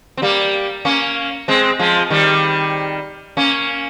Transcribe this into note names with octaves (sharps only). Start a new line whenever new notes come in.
C4
G3 A#3
A#3 C#4
G#3 C4
F3 G#3
D#3 G3
A#3 C#4